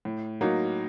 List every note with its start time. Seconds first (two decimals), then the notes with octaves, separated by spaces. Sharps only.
0.05 A2
0.41 F#3 A#3 D#4